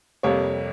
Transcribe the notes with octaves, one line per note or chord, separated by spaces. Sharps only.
F2 C3 G3 A#3 C#5